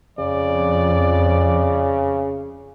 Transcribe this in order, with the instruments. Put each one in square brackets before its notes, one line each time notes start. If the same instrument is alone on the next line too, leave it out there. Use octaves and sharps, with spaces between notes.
[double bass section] F2 [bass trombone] C#3 [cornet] D5